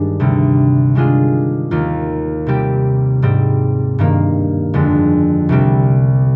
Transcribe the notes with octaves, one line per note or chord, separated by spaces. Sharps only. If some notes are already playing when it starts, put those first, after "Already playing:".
Already playing: G2 D#3 G#3 D4
D2 C3 G3
D#3 G#3 D4 F4 G#4
D#2 D#3 A#3 F4
C3 G3 C4 G4
G#2 G3 C4
G2 D#3 A#3
F2 D3 G#3
C2 C3 G3 C4